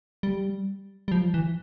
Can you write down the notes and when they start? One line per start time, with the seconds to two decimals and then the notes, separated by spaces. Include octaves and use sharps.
0.23 G3
1.08 G3
1.11 F3
1.34 E3